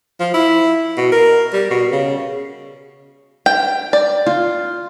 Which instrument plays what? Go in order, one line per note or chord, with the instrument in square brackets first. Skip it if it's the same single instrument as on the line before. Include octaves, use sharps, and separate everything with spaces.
[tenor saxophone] F3
E4
B2
A#4
G3
B2
C#3
[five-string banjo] G5
D5
[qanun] F4